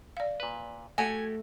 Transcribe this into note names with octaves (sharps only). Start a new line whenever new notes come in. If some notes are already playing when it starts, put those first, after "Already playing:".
D5 F5
A#2 B4
A3 F#4 G4 A4 F#5 G#5